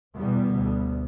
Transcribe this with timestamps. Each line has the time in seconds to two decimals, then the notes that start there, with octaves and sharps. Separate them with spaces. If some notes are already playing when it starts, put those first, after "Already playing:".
0.16 E2 B2 G3 B3
0.53 D2